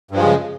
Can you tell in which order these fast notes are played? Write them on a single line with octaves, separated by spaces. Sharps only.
G2 F3 G#3 C#3